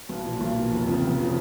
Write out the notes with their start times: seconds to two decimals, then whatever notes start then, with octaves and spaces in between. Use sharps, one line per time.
0.09 B1 B3
0.24 A#2 F3
0.40 B1 A#3
0.56 A#2 F3
0.72 F1
0.87 F2 C#3 F3
1.02 F1 B3
1.19 C#3 F3